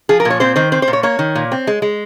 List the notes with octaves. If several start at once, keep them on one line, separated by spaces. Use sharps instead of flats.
F3 G#4
A#4
A#2
C#5
C4 C5
D#3 C5
C4 C5
C5
A#2
C#5
A#3 C#5
D#3
A#2
C4
G#3
G#3